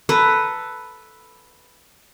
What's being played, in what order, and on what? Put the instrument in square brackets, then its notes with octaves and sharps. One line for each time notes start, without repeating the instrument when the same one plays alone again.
[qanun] A4 B4 A#5